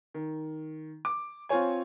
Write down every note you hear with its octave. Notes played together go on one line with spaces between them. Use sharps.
D#3
D6
C4 F4 C5 C#5 G#5